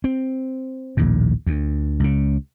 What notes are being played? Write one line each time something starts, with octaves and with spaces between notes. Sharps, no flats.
C4
A#1 D#2 A2
D2
C#2 C#3